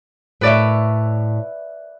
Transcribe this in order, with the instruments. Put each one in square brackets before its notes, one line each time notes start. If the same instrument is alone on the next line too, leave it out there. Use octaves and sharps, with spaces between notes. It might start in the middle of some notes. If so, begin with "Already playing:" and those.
[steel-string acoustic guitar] A2 C#5 [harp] B4 D5 E5